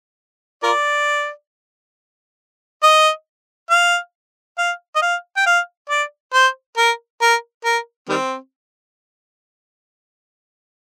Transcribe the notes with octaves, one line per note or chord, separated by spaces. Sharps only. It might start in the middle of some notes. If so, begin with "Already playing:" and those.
F4 A#4 D5
D#5
F5
F5
D#5
F5
G5
F5
D5
C5
A#4
A#4
A#4
D#3 G3 C4